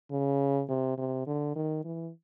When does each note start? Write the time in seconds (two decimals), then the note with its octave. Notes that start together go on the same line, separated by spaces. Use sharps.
0.11 C#3
0.69 C3
0.98 C3
1.27 D3
1.56 D#3
1.85 E3